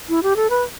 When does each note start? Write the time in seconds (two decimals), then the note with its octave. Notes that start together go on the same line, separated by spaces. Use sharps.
0.09 E4
0.23 G4
0.36 A4
0.50 B4